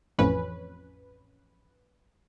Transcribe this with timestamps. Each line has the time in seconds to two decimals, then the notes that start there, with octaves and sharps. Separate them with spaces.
0.18 A1 F2 C#4 B4